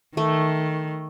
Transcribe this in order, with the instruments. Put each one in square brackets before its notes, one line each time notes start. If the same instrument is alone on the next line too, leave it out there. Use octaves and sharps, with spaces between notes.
[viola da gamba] D#3 [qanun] A3